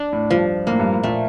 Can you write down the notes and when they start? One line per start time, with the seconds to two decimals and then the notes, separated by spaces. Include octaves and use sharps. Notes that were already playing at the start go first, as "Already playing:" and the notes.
Already playing: D4
0.13 A2
0.30 G2 F3
0.67 A2 A#3
0.80 G2
0.92 A2
1.03 A#2 A3